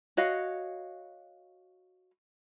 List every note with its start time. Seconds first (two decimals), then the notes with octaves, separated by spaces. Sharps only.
0.17 F#4 C#5 D#5 F5